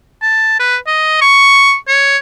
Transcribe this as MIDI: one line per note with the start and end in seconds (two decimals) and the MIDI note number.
0.22 0.57 81
0.59 0.76 71
0.87 1.21 75
1.21 1.75 85
1.88 2.17 73